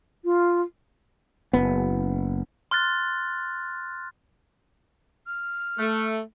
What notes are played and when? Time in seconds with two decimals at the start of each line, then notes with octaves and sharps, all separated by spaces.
0.25 F4
1.53 F#1 B3
2.71 C6 F6 F#6 A6
5.26 F6
5.79 A3